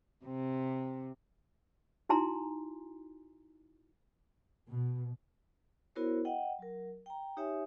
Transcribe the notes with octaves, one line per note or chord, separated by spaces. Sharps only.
C3
D#4 E4 F#4 G#5 A#5 C6
B2
B3 E4 F#4 A#4 C5 C#5
D#5 F#5 G5
F#3 A#4
G5 A#5
D#4 G4 C#5 E5 G#5